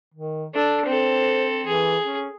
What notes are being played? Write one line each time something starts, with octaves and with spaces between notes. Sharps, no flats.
D#3
D4 A4
C4 A4 C5
E3 G#4
C#4